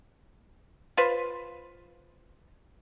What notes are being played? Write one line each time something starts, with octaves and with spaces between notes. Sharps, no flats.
F4 B4 C5